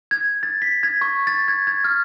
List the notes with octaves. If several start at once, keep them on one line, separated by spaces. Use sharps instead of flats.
G#6
A6
B6
G#6
C#6
A6
G#6
G#6
F6